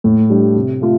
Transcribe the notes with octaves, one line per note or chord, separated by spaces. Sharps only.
A2
G3 D4 G4
C3
A3 F4